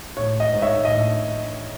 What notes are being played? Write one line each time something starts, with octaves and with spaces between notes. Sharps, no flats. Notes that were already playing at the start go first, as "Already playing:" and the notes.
A2 C#5
D#5
G#2
C#5 E5
A2 D#5